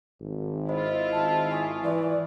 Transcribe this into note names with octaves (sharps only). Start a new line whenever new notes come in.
G#1
E4 F4 C5 D#5 B5
G#1 A5
G#5 C6 C#6 D#6
E3 D5